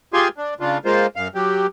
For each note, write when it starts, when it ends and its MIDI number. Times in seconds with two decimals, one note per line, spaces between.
0.13 0.28 65
0.13 0.28 67
0.13 0.28 68
0.13 0.28 80
0.13 0.28 84
0.38 0.54 62
0.60 0.78 49
0.60 0.78 62
0.60 0.78 65
0.85 1.07 56
0.85 1.07 58
0.85 1.07 65
0.85 1.07 72
1.16 1.28 42
1.16 1.28 77
1.35 1.66 54
1.35 1.66 67